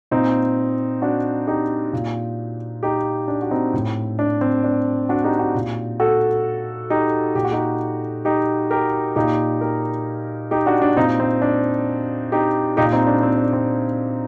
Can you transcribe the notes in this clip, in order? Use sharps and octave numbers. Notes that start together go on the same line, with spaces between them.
A#2 C4 D#4
D4 F#4
D#4 G4
A#2
D#4 G4
D4
F#4
C4 D#4
A2
D4
C4
D4
D4 F#4
D#4 G4
D4 F#4
A#2
F#4 A4
D#4 G4
A#2 G4
F#4
D#4 G4
D#4 G4
G4 A#4
A#2 D#4 G4
G4 A#4
D#4 G4
D4 F#4
D4
A#2 C4 D#4
C4
D4
D#4 G4
A#2 D#4 G4
C4 D#4
D4
C4
D4
C4